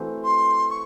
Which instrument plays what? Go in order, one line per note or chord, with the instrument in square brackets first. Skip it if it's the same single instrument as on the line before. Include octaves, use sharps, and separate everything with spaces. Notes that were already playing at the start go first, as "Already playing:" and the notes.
Already playing: [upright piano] E3 A3 C4 F#4 C5
[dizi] C6
C#6